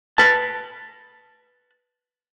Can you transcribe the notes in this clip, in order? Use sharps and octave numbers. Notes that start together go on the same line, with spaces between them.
B4 A5